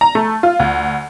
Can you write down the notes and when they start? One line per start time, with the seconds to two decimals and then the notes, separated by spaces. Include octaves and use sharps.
0.01 A#5
0.15 A3
0.43 F4
0.60 D2